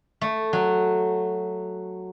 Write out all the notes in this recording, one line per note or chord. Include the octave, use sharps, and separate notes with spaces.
A3
F#3